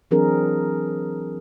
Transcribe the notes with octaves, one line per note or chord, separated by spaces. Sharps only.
E3 F#3 C4 D4 G#4 A#4